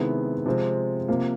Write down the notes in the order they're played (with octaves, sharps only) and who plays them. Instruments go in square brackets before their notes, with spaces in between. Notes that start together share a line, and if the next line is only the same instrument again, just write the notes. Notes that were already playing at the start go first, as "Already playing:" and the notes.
Already playing: [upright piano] C3 D#3 G#3 B3 E4
C3 F3 G#3 C4
C3 F3 A#3